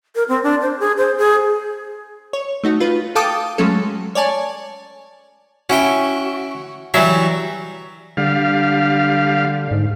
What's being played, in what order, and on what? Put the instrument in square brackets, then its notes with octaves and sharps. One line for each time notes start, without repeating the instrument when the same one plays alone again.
[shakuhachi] A#4
C4
D4
C5
G#4
C5
G#4
[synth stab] C#5
A3 D#4 F#4
F4 B4
A4 F5 G5 A5 D6 D#6
F#3 G#3 A3 C#4 A4
C#5 D5 G#5 A5
[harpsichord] C#4 E4 G5 [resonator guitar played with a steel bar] F#4
[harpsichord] E3 G3 E5 [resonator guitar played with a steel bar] F#3
[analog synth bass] D3 [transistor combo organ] G3 F5
[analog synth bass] G#2